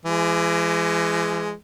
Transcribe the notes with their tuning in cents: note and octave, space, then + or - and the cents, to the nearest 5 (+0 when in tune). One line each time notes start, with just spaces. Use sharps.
E3 +40 G#3 +0